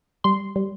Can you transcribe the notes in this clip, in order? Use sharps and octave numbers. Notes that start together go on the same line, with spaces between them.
G3 C6
G3